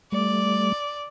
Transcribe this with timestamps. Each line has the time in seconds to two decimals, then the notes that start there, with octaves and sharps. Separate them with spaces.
0.12 G3 A3 D5